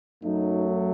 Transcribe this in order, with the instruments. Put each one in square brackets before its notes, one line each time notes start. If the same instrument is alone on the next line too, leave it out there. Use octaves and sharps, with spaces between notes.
[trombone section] F#2 F#3 A3 D#4